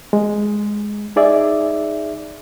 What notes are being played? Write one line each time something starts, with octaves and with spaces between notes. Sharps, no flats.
G#3
D#4 G#4 D5 E5